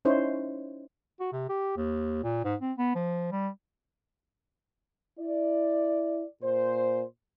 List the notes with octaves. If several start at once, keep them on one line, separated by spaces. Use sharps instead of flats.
C#4 D#4 E4 C5 C#5
F#4
C3
G4
D#2
A#2
G#2
C4
B3
F3
G3
E4 D5
A#2 C5